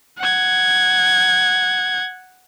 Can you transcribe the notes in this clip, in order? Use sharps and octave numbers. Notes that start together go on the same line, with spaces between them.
F#5 G#6